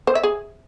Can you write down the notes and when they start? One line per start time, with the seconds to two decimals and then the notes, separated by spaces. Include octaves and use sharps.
0.07 C5
0.15 E5
0.23 G#4